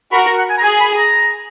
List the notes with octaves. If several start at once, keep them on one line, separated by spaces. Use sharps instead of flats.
F#4 A#4 B5
A#5
F#5
G#5
A#5
G#4 G#5
B5
A#5